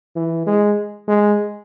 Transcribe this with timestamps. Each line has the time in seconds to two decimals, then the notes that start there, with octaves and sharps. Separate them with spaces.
0.16 E3
0.46 G#3
1.07 G#3